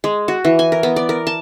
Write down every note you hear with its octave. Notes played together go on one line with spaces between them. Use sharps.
G#3
F#4
E3
G#5
A#4
B3
D5
A#4
A5